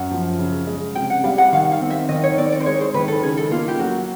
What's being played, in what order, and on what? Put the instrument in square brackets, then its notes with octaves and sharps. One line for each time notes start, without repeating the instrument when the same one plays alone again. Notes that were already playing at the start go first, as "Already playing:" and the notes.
Already playing: [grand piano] F#2 [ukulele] F#5
[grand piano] F3
C#3
G#3
[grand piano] C3 [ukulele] G5
[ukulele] F#5
[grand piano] G3 [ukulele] F5
[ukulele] F#5
[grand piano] D#3 [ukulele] F5
[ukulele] F5
[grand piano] C4
[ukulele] E5
[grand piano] D#3 [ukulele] D#5
[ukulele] C#5
[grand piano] C4 [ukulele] D5
[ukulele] D5
C5
[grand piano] G#3 [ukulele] C#5
[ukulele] C5
[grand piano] D#3 [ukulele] B4
[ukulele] A4
[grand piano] C#3 [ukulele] G#4
[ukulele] A4
[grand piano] A#3 [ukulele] F4
[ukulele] G4
[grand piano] F#3 [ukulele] F#4